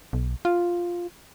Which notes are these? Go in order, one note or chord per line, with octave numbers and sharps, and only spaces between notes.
B1
F4